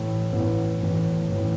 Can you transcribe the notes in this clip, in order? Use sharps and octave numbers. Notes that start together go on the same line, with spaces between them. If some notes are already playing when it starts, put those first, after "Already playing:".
Already playing: A2 E3
A2 E3 B3
A2 E3
A2 E3